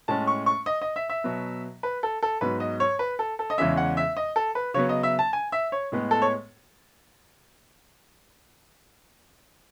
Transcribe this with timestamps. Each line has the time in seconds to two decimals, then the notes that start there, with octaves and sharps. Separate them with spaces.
0.08 A2 G#3 C#4 A5
0.27 C#6
0.46 C#6
0.66 D#5
0.82 D#5
0.96 E5
1.10 E5
1.24 B2 F#3 B3
1.83 B4
2.03 A4
2.23 A4
2.41 G#2 F#3 B3 B4
2.60 D#5
2.80 C#5
2.99 B4
3.19 A4
3.39 A4
3.50 D#5
3.58 E2 C#3 G#3 C#4 E5
3.77 F#5
3.97 E5
4.17 D#5
4.36 A4
4.55 B4
4.74 C#3 F#3 B3 C#5
4.89 D#5
5.03 E5
5.19 A5
5.33 G#5
5.52 E5
5.72 C#5
5.92 A2 G#3 B3
6.11 A4
6.22 C#5